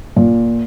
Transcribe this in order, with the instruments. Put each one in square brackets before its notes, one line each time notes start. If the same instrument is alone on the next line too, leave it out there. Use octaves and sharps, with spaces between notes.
[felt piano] A#2